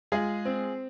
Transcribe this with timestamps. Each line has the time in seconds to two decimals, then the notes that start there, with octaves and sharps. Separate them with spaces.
0.12 G#3 F4 G#4
0.45 C4